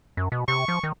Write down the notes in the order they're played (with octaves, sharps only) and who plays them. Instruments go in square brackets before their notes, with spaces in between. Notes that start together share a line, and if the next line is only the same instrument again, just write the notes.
[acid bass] F#2
B2
[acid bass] C3 [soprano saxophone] C#6
[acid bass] F3
D#3